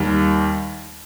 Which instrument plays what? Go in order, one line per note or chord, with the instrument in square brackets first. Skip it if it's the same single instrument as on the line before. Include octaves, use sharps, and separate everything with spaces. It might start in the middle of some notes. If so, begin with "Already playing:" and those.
Already playing: [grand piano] D#2 D#3 G3